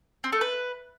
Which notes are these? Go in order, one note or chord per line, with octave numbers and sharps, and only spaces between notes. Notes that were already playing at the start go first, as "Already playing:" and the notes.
C4
A3
B4